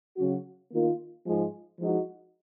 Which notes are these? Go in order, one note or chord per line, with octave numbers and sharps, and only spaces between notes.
C#3 F#3 C#4 F#4
D#3 A#3 F4
G#2 F3 G#3
F3 G#3 D#4 F#4